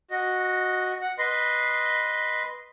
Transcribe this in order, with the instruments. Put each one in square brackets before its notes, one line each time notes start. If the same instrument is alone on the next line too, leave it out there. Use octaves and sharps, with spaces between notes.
[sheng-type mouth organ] F#4 D#5
F#5
B4 D#5 C6